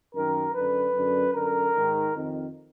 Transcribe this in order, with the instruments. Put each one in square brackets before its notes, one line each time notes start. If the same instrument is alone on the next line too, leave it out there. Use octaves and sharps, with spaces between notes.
[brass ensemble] F#2 D#3 A#4
F#2 D3 B4
F#2 D3
F#2 D3 A#4
G#2 D#3
F2 D#3